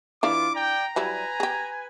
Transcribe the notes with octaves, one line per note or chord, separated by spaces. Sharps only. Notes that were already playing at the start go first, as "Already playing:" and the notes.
E3 D4 E4 F4 F5 D6
D5 G5 A#5
F#3 G3 E4 B4 G#5
G4 G#4